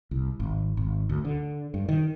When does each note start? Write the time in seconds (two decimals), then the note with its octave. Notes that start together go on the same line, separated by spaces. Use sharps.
0.11 C2
0.40 G#1
0.77 G#1
1.09 D2
1.25 D3
1.74 G2
1.89 D#3